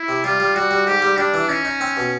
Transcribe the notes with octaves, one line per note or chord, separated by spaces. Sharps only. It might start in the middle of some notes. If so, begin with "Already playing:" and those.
Already playing: E4
C3
G3 F4
G3
G3 F#4
G3
G#2 G4
G3
G3 D4
E3
C#4 D#4
D#4
C4
B2